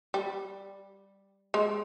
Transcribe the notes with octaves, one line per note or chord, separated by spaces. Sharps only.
G3
G#3